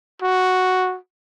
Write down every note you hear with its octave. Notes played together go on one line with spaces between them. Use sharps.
F#4